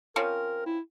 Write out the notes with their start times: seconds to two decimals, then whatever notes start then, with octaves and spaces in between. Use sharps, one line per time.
0.16 F3 C4 C#4 A#4
0.66 E4